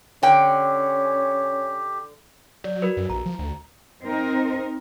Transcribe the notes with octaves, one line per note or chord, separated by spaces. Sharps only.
D3 C#4 G4 G5
F#3 D5
F#4 A#4 B4
F#2
A#1 A#5
F3
D2
C4 D#4 A#4